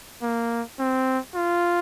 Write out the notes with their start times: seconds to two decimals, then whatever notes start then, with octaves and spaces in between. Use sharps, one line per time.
0.22 A#3
0.79 C4
1.35 F4